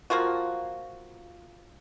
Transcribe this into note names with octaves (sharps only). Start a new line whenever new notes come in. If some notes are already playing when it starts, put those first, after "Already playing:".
F3 A#3 F4 F#4